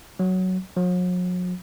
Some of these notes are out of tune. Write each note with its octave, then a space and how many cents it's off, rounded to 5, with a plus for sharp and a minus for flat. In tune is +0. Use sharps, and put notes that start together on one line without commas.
F#3 +5
F#3 -45